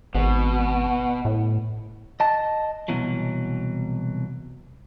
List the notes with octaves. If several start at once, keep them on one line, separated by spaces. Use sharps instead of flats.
G#1 B2
A2
D#5 A5
C2 B2 E3 F#3